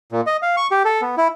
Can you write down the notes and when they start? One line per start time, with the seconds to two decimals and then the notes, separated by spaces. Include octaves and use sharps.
0.12 A#2
0.27 D#5
0.42 F5
0.57 C#6
0.71 G4
0.85 A4
1.02 B3
1.17 E4